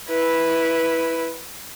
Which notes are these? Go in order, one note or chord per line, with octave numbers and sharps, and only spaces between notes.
E4 B4